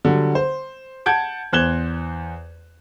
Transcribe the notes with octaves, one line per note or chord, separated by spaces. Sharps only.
D3 F#3 G3
C5
F#5 A5 G6 G#6 D7
E2 C5 F#6 G#6 E7 G7